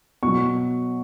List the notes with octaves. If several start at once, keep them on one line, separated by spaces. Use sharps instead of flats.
B2 F#3 C#6